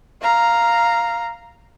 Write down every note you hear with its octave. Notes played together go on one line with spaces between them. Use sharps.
F5 A#5